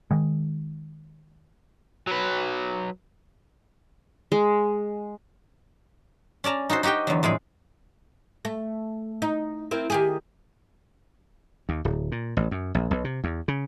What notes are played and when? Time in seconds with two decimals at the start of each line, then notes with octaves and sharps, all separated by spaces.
0.11 D#3 G#3
2.07 F#3 B4
4.32 G#3
6.44 C#4 D5 A5 A#5
6.70 D#4 F#4 A4 C5
6.83 D#4 F#4 G4 D#5 G5
7.07 E2 D3 F#3
7.23 F2 A2 G#3 G#4
8.45 A3
9.22 D#4
9.71 C4 E4 A#4
9.90 D#3 G4 G#4
11.69 D#2
11.85 D1
12.12 A#2
12.37 A1
12.51 F#2
12.75 A#1
12.91 B1
13.04 C3
13.24 E2
13.48 C#3